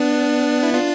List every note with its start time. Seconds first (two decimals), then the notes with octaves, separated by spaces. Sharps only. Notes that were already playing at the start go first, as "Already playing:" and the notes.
Already playing: B3 D4
0.63 E4
0.74 D4 F4